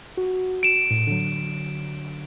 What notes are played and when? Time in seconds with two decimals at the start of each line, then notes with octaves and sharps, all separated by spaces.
0.17 F#4
0.63 D7 E7
0.91 A2
1.07 D3 F#3